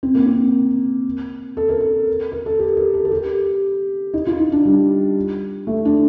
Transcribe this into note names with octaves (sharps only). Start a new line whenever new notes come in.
C4
A#3
C4
A4
A#4
A4
A#4
A4
G4
A#4
A4
A4
G4
D#4
F4
D#4
D4
G3
A3
D4